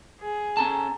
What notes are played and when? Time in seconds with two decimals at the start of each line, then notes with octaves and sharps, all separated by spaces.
0.21 G#4
0.57 C#4 A4 A5 A#5